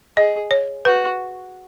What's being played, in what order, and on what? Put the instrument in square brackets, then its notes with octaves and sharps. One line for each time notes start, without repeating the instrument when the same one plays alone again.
[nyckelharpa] G#4 [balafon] D#5
[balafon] C#5
[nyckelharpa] F#4 [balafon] B4